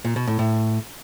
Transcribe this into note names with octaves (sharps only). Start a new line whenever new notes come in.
A#2
B2
A2
A2